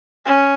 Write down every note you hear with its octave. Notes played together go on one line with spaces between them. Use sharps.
C#4